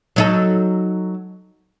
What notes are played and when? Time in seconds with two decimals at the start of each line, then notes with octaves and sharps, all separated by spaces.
0.16 F#3 D#4 A4